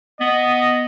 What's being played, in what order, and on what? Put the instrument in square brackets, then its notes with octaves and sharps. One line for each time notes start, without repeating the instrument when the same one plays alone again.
[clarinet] B3 [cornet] D#5